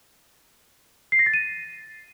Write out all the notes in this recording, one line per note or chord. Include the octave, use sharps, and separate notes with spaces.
C7
A#6
A6
D#7